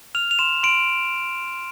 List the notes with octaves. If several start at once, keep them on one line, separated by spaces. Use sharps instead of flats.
F6 F7
F7
C6 E7
C6 D7